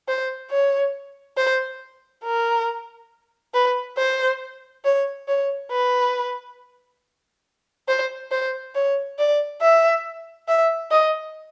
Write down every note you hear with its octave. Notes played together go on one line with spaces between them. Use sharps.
C5
C#5
C5
A#4
B4
C5
C#5
C#5
B4
C5
C5
C#5
D5
E5
E5
D#5